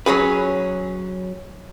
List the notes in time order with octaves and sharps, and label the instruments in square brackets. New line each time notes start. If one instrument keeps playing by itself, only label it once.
[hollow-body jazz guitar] F#3 C#4 G#4 B4